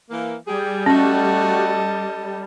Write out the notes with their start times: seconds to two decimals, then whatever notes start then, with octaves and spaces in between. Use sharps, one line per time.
0.10 E3 A#3
0.48 G3 G4 G#4
0.86 A3 C#4 F#4 A4 D#5